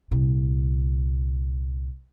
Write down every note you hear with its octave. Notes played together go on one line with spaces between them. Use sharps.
C2 A#2